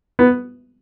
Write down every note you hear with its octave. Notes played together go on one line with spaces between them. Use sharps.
B3